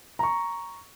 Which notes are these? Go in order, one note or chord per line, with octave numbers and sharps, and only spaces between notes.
A#5 C#6